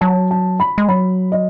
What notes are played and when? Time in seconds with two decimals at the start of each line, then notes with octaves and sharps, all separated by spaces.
0.01 F#3 A5
0.31 A5
0.60 B5
0.78 G#3
0.88 F#3 B5
1.32 D#5